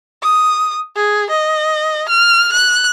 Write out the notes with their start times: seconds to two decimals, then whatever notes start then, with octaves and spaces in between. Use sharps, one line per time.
0.23 D#6
0.96 G#4
1.30 D#5
2.08 F6
2.52 F#6